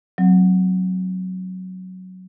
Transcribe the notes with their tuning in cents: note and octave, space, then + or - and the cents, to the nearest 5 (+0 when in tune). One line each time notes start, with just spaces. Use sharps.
F#3 +0 C4 +10